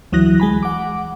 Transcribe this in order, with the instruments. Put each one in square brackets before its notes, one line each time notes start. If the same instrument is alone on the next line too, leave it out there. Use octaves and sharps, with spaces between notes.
[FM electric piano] D2 E3 F#3 D#6 F#6 A#6
G#3 G#5 B5
F#5 D6